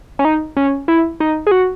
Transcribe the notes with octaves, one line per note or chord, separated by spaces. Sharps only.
C#4
D#4
C#4
E4
D#4
G#4
F#4